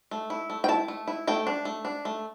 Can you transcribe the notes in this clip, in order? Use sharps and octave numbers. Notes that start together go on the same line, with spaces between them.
A3
E4
A3
G5
E4 A5
A3
E4
A3 G5
D4
A3
D4
A3